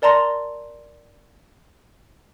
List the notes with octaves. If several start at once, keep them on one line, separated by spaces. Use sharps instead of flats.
A#4 D5 A5 A#5 C6 A#6